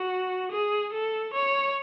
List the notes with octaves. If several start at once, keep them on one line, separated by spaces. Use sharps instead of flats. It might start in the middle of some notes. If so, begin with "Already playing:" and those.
Already playing: F#4
G#4
A4
C#5